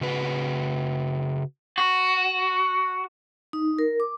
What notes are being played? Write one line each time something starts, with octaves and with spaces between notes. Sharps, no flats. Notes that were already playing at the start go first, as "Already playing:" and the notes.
C#3 F#4 B4
F#4
D#4
A#4
D6